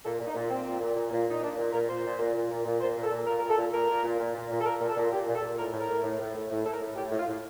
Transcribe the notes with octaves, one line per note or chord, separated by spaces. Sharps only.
A#2 A4
A#2
D#4
A#2
A#2 C4
A#2
A#2
A#2
A#2
A#2 D#4
A#2 D4
A#2
A#2 A#4
A#2 C5
A#2
A#2
A#2
A#2
A#2
A#2 C5
A#2
A4
A#2
A#2 A#4
A#2 A#4
A4
A#2
A#2 A#4
A#2
A#2
A#2
A#2
A#2
A4
A#2 A#4
A#2
A4
A#2
A#2 G4
A#2
A4
A#2
A2 A#4
A2
A#4
A2
A2
A2
A2
A2
A2 A4
A#4
A2
A2 G4
A2
F4
A2